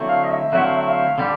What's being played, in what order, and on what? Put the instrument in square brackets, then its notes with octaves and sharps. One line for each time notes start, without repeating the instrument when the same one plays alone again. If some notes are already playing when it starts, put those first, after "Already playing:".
Already playing: [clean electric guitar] D3 F#3 A3 C4 E4
[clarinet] F5
D#5
E5
[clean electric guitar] D3 F#3 A3 C4 E4 [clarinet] F#5
[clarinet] F5
E5
F5
[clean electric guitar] D3 G3